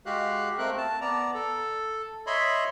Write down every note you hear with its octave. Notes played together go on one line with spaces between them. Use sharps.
G#3 F#4 G4 F5 F#6
A3 C4 A#4 F#6
A5
B3 D5 A#5
A4
C#5 D#5 E5 B5 C6